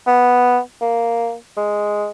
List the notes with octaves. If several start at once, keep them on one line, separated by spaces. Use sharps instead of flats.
B3
A#3
G#3